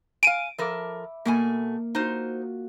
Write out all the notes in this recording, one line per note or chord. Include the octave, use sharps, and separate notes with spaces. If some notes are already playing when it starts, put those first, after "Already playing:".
F5 G#5 D7 D#7
F3 A4 A#4 E5 B5 D6
B2 A3 A#3 G#5
D#4 F4 F#4 C5